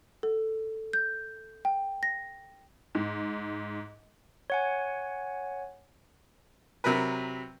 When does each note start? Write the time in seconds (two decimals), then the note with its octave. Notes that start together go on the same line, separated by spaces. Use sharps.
0.23 A4
0.93 G6
1.65 G5
2.03 A#6
2.95 G#2
4.50 C#5 F#5 G#5
6.84 C3 F#3 A#4 B4